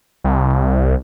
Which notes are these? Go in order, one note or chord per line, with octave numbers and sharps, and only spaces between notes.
C2